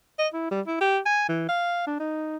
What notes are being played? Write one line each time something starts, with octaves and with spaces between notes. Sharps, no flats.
D#5
E4
G3
E4
G4
G#5
E3
F5
D4
D#4